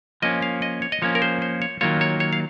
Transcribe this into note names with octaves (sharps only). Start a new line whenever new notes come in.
F3 A#3 C#4 D#5
F5
D#5
C#5
D#5
F3 A#3 C#4 C#5
A#4
C5
C5
C#5
D#3 F#3 A#3 F4 C#5
C#5
C#5
F5